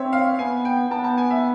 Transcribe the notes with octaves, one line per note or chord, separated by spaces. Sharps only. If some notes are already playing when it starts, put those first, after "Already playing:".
Already playing: C4 C#5 E5
F5
B3 G#5
G5
B3 A5
A5
G#5
E5